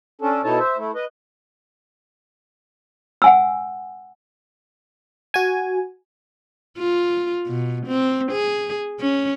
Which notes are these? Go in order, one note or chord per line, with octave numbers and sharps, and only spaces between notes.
C#4 D4 A4
B2 D#4 E4 A4 C#5 A5
C5 E5
A3 E4
B4 D#5
F#5 G#5 E6
F#4 G#5
F4
B2
C4
G#4
C#4